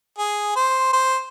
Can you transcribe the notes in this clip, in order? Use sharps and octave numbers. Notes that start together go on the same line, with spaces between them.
G#4
C5
C5